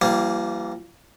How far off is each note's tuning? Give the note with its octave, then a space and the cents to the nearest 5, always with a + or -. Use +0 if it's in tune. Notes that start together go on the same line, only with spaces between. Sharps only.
E3 +35 G3 -30 A#3 -5